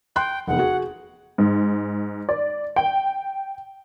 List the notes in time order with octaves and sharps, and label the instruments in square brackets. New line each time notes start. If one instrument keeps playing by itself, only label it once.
[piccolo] G5 [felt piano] C6 F#6
[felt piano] F1 E2 [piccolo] F#5
[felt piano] F#4 G#4
[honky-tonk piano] G#2
D5
G5